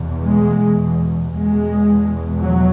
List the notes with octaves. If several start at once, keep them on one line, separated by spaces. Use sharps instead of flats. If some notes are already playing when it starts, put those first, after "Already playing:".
Already playing: E2 B2
G#3
E2 B2 G#3
F#3